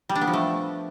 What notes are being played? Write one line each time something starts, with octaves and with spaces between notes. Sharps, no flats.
G3
D4
B3
F3
A3